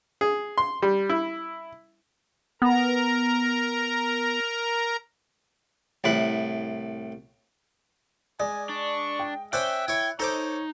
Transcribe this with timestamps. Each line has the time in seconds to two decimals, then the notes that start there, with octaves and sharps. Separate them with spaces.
0.21 G#4
0.58 C6
0.82 G3
1.09 E4
2.62 B3 A#4 A#5
6.04 C2 A2 B4
8.40 G#3 D5 G#5
8.69 D4 C#6
9.19 G5
9.53 C#4 C5 D5 E5 G5 F#6
9.88 E4 C#5 G#6
10.20 D#4 A4 C5 C#5 D6